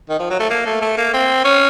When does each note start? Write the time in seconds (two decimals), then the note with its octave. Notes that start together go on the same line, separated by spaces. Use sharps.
0.09 D#3
0.20 F3
0.30 F#3
0.40 A3
0.50 A#3
0.66 A3
0.82 A3
0.97 A#3
1.14 C4
1.45 C#4